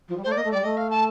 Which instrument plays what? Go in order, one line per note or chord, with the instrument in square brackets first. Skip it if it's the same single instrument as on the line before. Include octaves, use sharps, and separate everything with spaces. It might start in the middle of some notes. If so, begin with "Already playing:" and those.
[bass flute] F3
G3
[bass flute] A3 [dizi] C5
[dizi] D5
[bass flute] A#3 [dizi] D#5
[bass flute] A3
[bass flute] G3 [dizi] D5
[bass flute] A3 [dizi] D#5
[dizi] F5
A5